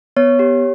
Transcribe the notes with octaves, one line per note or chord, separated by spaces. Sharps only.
B3 C#5
G4